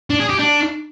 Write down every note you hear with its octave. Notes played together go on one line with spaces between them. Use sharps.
D4
G#4
G4
D4